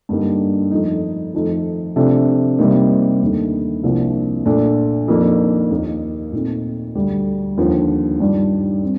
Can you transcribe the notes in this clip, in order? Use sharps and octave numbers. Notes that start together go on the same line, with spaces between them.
G2 D3 G3 A#3 D#4
F2 D#3 A3 D#4
F2 D#3 A3 D#4
C3 F3 A3 D4
C3 G3 A#3 D#4
D#2 D3 A3 D#4
C2 C3 F3 A#3 D4
A#2 A3 D4
F2 D#3 A#3 D4
D#2 D#3 A#3 D#4
A#2 A3 C4 D#4
D2 D3 G3
D#2 D3 F3
G2 D#3 G3 D4
C4